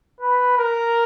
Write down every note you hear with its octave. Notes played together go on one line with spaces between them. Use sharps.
B4
A#4